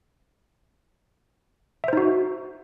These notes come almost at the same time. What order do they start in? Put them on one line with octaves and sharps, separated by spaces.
E5 C5 D#4 F#4